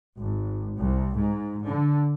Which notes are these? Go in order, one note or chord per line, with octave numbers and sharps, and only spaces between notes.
G#1
C2
G#2
D3